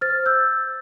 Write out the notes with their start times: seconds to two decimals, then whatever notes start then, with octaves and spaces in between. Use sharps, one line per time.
0.01 C5 F6 A6
0.26 E6 G6